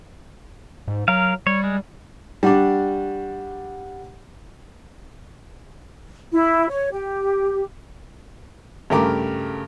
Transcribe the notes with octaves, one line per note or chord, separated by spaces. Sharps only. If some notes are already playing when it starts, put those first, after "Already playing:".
G#2
F#3 A#4 F5
G3 C#5
G#3
G3 D4 G4 F#5
E4
C#5
G4
G2 C#3 A3 G4 A#4 D6